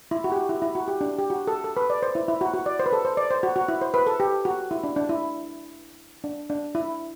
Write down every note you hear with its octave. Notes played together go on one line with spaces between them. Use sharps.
E4
F#4
G4
F#4
E4
E4
F#4
G4
D4
G4
F#4
A4
A4
B4
D5
C5
E4
E4
F#4
F#4
D5
C5
B4
A4
C5
D5
C5
F#4
F#4
E4
C5
B4
A4
G4
F#4
E4
D4
D4
E4
D4
D4
E4